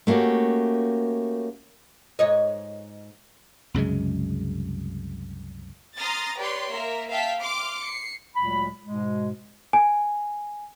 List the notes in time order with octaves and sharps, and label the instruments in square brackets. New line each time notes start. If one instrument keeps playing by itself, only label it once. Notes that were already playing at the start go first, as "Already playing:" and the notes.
[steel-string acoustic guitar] A3 A#3 C#4 F#4 G4
[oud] G#2 C#5 D#5
[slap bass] C2 F#2 C#3 G#3
[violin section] A#5 C6 D#6 F6 A6 A#6
G4 B4 C#5 D5 C6
A#3 A#4 E5
E5 F5 G5 A5 B6
C6 D6 F6 D7
C7 C#7
[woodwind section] D2 A#2 F#3 G#3 B5
G#2 B2 G#3
[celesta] G#5